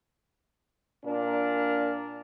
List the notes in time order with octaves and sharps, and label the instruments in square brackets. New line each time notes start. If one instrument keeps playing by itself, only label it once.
[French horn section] A#2 D4 A#4 D5